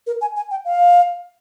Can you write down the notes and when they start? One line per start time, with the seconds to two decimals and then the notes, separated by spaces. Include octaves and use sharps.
0.07 A#4
0.21 G#5
0.36 G#5
0.51 G5
0.65 F5